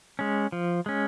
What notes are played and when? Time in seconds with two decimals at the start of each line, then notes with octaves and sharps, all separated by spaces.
0.19 G#3 C#4
0.52 F3
0.86 G#3 C#4